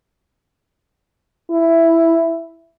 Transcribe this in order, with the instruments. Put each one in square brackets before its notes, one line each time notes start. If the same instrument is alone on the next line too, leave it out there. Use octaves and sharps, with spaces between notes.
[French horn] E4